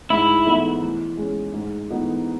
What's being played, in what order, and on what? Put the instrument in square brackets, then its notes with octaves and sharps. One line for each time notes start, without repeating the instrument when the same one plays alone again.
[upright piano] G#2 [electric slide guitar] E4
[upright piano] E3 B3 D#4 A4
E3
G#3 C#4
G#2
E3 B3 D#4 A4